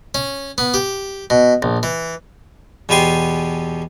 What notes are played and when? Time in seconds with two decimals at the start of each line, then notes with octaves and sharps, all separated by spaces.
0.15 C#4
0.58 B3
0.74 G4
1.30 B2
1.62 A#1
1.83 E3
2.89 E2 B2 B3 G4 G#5 C6